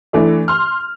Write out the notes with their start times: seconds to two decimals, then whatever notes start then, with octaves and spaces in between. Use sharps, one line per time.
0.13 E3 A3 D4
0.48 C6 F6